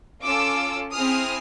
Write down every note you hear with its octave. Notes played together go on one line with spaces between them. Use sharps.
C#4 F4 A4 D6 E6
C4 E4 G#4 D#6 F6